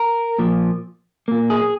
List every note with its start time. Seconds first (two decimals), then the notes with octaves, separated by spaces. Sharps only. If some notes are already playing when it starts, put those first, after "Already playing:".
Already playing: A#4
0.38 A#2 F3 A#3
1.28 A#2 A#3
1.50 G#4